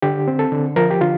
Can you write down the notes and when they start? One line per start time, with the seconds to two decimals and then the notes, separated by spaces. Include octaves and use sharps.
0.02 D3 G4
0.28 C4
0.39 A4
0.52 D3
0.76 F3 A#4
0.90 G4
1.01 D3 F4